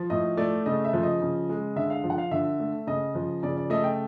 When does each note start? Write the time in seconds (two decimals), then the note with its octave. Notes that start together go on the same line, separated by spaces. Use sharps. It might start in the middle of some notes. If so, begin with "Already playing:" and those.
Already playing: F3
0.10 A2 D#5
0.37 A3 D5
0.66 C#3 D#5
0.85 E5
0.93 F3
1.03 D#5
1.22 C#3
1.49 G#3
1.76 D3 E5
1.90 F5
2.04 F3
2.10 F#5
2.18 F5
2.31 D3 E5
2.60 A3
2.87 C#3 D#5
3.15 F3
3.43 C#3 D5
3.57 D5
3.70 A3 D#5
3.84 G5